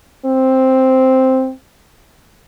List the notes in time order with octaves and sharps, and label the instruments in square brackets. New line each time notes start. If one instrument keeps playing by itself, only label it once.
[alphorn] C4